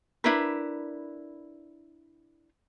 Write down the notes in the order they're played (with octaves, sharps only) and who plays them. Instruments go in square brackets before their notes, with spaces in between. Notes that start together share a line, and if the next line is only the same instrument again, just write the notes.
[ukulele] D4 E4 A#4 B4